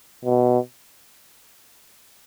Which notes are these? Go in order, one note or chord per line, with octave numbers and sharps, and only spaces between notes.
B2